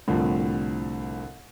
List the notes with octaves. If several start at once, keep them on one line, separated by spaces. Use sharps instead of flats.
C2 A2 D3 F3 C4